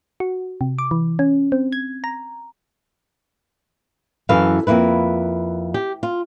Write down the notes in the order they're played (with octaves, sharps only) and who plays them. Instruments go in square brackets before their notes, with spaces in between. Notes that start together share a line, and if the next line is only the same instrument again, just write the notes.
[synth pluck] F#4
C3
D6
E3
C#4
C4
G#6
A#5
[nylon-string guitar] F#2 E3 F#4 A4 B4 F5
F2 G#2 A#3 E4 B4
G4
F4